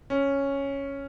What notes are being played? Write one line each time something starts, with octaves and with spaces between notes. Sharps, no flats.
C#4